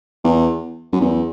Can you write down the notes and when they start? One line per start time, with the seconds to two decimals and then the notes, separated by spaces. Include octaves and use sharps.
0.24 E2
0.92 F#2
1.01 E2